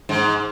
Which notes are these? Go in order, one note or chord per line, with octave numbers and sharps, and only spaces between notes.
G#2